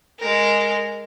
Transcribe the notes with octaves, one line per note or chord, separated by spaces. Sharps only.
G#3 A#4